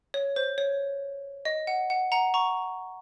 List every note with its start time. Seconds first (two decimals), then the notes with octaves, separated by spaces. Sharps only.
0.14 C#5
0.36 C5
0.58 C#5
1.45 D#5
1.67 F#5
1.90 F#5
2.12 F#5 A#5
2.34 A#5 C#6